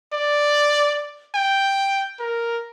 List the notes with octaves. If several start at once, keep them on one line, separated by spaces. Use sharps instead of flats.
D5
G5
A#4